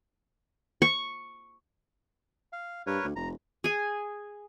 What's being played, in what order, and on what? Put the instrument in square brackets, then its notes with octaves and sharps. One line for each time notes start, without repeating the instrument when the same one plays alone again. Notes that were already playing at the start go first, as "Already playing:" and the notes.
[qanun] C#6
[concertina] F5
[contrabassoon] G2 [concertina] A#4 B4 C#5
[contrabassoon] D2
[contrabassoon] F1 [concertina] A#5
[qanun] G#4 G#5